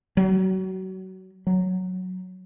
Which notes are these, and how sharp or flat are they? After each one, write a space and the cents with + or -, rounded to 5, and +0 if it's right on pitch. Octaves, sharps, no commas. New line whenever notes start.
F#3 +25
F#3 -5